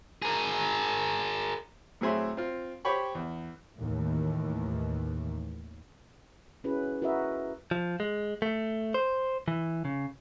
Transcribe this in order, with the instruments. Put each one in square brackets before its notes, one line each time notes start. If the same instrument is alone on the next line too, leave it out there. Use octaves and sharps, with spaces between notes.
[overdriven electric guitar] G#4 A#4
[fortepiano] A2 F#3 C4 G#4 E5 C6
C4 F4
G4 C5 C#5 G5 B5 C#6
E2
[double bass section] D#2 A2 D#3 E3
[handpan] C#4 E4 F#4 G#4 B4
E4 F#4 A#4 B4 D#5 E5
[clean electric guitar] F3
G#3
A3
C5
E3
C#3